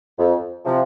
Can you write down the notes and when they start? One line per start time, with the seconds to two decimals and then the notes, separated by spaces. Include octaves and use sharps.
0.18 F2
0.65 C3 F3